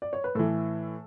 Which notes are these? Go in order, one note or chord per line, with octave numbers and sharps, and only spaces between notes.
D5
C#5
B4
A2 E3 A4